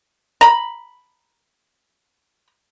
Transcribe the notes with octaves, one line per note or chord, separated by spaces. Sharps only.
A#5 B5